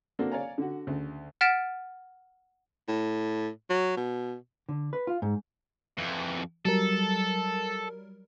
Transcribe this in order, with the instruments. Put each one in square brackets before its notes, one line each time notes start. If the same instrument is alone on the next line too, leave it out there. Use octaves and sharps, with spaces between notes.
[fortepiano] A#3 C4 D4 F#4 A4
C#5 D5 F5 G#5 A#5
D3 F#4
D2 C#3
[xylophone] F#5 F6 A6 B6 D7 E7
[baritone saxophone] A2
F#3
B2
[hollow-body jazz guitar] D3
B4
F4
G#2
[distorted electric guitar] F2 E3
[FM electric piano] F#3 G3 A#4 [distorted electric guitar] A4